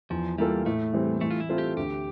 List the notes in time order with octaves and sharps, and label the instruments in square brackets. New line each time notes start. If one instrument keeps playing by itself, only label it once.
[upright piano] E2 [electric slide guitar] F3
[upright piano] E3 A#3 F4 A4 [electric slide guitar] G3
[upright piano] A2 [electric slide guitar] A3
[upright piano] E3 G3 C4
[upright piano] E3 [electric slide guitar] A3
[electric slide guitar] F4
E4
[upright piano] A3 C4 F4
[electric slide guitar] G4
[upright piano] D2 [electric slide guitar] G4